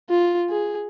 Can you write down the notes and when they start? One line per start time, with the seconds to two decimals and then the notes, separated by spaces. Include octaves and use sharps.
0.10 F4
0.50 G#4